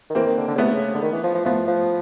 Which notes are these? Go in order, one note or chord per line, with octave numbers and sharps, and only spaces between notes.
D#3
E3 A#3 C4
D#3
D3
D3
C#3
C3 A3 B3
C#3
D3
D#3
E3
F3
F3
F3 A3 B3
F3